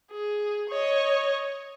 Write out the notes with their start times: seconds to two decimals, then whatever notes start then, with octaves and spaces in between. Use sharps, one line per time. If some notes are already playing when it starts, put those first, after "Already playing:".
0.12 G#4
0.69 C#5 D#5